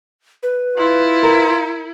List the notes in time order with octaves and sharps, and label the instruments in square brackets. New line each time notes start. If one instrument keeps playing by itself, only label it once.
[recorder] B4
[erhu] E4 [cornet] F4
[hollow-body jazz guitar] A#4